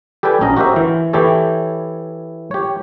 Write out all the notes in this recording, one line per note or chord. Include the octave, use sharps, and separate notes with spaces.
G4 A4 B4 D5 G5 G#5
A#1 C#4 F#4 D#5 A#5
F#4 G4 A#4 C5 E5
E3
E3 E4 G4 A4 C#5
G4 C#5